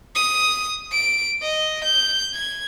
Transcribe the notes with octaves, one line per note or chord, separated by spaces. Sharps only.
D#6
D7
D#5
G6
G#6